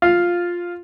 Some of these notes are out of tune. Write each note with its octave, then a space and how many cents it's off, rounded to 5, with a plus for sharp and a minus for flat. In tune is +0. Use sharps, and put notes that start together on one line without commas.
F4 +5 F5 +0